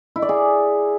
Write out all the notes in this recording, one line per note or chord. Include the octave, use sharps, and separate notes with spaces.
E4
D5
G#4